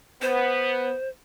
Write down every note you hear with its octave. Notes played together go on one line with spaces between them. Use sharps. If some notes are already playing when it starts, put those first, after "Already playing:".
B3 C5